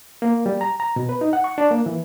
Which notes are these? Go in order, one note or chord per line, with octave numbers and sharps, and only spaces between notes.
A#3
G3
A#5
A#5
B2
B4
D#4
F#5
C#6
D4
A#3
E3